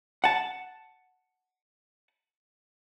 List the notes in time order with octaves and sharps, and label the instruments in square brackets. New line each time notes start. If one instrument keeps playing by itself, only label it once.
[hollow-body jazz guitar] F#5 A5